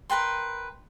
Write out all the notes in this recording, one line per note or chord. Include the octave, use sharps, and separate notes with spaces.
A#4 B4 G5 C6